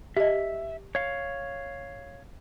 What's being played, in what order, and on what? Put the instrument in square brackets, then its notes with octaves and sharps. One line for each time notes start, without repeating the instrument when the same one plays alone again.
[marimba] G4 D#5 [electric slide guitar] E5
[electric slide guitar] C#5 F5